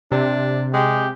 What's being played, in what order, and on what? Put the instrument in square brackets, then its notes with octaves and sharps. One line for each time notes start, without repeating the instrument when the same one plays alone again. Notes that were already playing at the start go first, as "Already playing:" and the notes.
[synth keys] C3 [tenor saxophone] D4
[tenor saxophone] G#3 [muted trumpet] G4